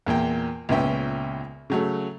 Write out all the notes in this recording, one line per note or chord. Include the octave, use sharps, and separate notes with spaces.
E2 A#2 A#3 G5
C#2 A#2 B3 C#4 E5 G5
C#3 F#3 A3